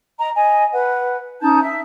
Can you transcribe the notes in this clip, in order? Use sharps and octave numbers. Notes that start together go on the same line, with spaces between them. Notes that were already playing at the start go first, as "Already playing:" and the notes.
D#5 A#5
D#5 G#5
B4 F#5
C#4 D#4 A5 G6
E5